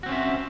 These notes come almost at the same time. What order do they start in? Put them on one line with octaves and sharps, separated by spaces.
F#4 C4 C#4 E5